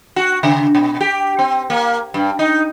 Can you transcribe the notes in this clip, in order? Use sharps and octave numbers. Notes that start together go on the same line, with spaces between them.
F#4
C#3
B2
G4
C4
A#3
G2
D#4